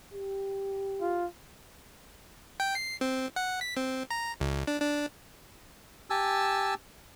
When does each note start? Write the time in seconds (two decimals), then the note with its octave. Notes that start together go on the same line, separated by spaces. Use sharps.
0.14 G4
1.01 F4
2.60 G5
2.75 C7
3.01 C4
3.36 F#5
3.61 B6
3.77 C4
4.11 A#5
4.40 C#2
4.67 D4
4.81 D4
6.10 G4 G#5 A5 E6